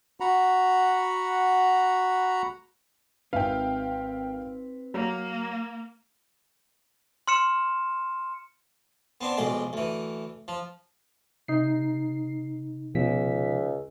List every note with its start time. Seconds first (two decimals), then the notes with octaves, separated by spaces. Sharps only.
0.20 F#4 F#5 A#5 B5
3.33 G#1 C4 B4 E5 F5 G5
4.94 F#3 A#3 A#5
7.28 C6 F6 C#7 E7
9.21 B3 C4 D4
9.37 B1 F2 G#3 D5
9.73 D2 E3
10.48 F3
11.48 C3 D#4 C7
12.95 C#2 B2 F3 B6